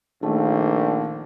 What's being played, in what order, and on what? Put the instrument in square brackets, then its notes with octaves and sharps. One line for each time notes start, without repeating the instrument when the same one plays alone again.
[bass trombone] A#1 [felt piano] D#3 A3 A#3